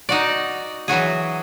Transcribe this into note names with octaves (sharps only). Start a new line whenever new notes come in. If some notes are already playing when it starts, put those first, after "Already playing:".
D#4 F#4 D5
E3 F#3 F#4 G#4